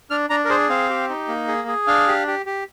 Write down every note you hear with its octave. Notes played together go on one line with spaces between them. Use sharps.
D4 F6
D4 A#5
A#4
G#4 C5
C4 F5
G4
D#4
A#3
G#4
G#4
D4 F5
G4
G4
G4